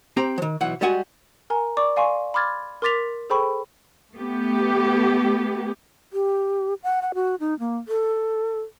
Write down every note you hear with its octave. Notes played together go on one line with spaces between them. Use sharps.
C4 G4 A#5
D#3 F3
B1 E3 F#5
G3 G#3 F#4 F#5 G#5
A#4 G#5 A#5
D5 C#6 D6
D5 F5 G#5 C6 C#6
B5 C6 D6 F6 G#6 A6
A#4 C6 D6 A6 B6 F7
G#4 A4 C5 G5 B5 C#6
A3 B3 G4
G4
F#5
F#5
F#4
D#4
A#3
A4